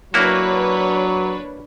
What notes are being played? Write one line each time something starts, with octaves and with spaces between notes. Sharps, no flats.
F#3 A#3 D4 E4 F#4 B4 C#5